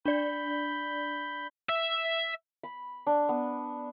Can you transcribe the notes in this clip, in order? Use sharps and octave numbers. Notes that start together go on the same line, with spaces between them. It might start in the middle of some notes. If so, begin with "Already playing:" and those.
D4 D5 B5 G6
E5
B5
D4
B3